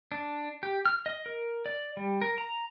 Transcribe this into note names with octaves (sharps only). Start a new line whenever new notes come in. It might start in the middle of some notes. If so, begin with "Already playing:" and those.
D4
G4
F6
D#5
A#4
D5
G3
A#4
A#5